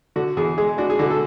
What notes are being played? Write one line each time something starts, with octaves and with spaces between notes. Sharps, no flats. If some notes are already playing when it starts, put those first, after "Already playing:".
D3 F#4
E2 G#4
G#3 G#4
D4 F#4
G#4
D3 F#4
A4